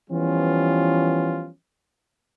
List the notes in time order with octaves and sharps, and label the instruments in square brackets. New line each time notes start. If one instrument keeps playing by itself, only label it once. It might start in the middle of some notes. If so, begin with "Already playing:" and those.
[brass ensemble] E3 F3 G3 B3 C#4 F4